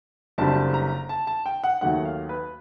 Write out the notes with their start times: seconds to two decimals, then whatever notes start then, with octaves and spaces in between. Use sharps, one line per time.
0.38 F#1 F#2 D3 G3 C4 A5
0.74 A#5
1.09 A5
1.27 A5
1.46 G5
1.64 F#5
1.81 D#2 D#3 F#3 A3 F#5
2.05 F5
2.29 B4